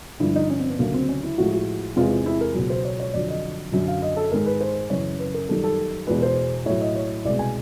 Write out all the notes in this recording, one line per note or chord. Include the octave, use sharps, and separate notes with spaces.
G2 D3 F3 E4
D#4
C#4
C4
B3
D2 C#3 F#3 A#3
C4
C#4
E4
A2 F3 G#3 F#4
F#4
E2 C3 E3 G#3 F4
E4
A#4
C#2 B2 F#3
C5
C#5
C#5
F2 D3 F#3 D5
D#5
F#2 D3 F#3
F5
D#5
A4
G#2 D#3 G#3 A#4
B4
C5
F#2 C#3 E3 C#5
B4
A#4
F#2 D#3 G3 A4
A4
E2 B2 G#3 B4
C5
A2 F#3 C#5
D#5
C#5
C2 B2 G#3 D5
G#5